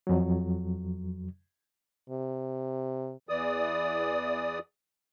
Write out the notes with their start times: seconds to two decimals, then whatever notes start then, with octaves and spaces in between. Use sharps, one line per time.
0.07 F2 F#3
2.10 C3
3.29 E2 E3 D5 D#6